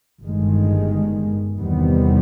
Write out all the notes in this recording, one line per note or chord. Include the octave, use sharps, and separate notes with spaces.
G1 G2 D#3 G#3
E2 C3 D#3 G3 B3